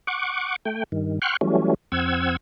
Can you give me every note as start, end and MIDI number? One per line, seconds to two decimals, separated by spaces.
0.07 0.56 78
0.07 0.56 85
0.07 0.56 86
0.65 0.84 57
0.65 0.84 79
0.92 1.19 43
0.92 1.19 51
1.22 1.37 78
1.22 1.37 79
1.22 1.37 84
1.22 1.37 85
1.22 1.37 89
1.22 1.37 90
1.41 1.74 52
1.41 1.74 54
1.41 1.74 55
1.41 1.74 57
1.41 1.74 61
1.92 2.37 41
1.92 2.37 60
1.92 2.37 78
1.92 2.37 88
1.92 2.37 92